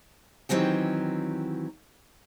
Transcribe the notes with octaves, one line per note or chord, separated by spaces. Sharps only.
D#3 E3 F#3 C4 G4